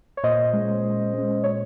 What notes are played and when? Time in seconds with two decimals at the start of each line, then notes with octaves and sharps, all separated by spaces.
0.17 C#5
0.23 A#2 C5 D#5
0.53 G#3 C#4
0.83 A#2
1.14 G#3 C#4
1.44 A#2 C#5